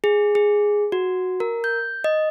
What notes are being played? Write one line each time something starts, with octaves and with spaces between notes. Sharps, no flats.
G#4
G#4
F#4
A#4
G6
D#5